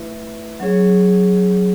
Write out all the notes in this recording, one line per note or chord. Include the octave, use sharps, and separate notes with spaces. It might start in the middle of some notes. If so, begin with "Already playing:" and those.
Already playing: A3 E4 B4 E5
F#3 C#4 G#4 C#5